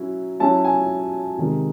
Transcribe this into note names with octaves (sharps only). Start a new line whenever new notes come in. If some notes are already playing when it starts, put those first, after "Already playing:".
Already playing: F#3 C#4 E4
F#3 C#4 E4 A5
G#5
C3 D#3 G#3